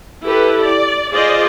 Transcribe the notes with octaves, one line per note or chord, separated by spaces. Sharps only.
E4 G4 A4 B4
D5
F4 G#4 C5 D5 D#5